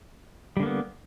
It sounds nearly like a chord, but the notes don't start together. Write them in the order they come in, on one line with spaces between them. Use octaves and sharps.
G3 D3 A#3 B3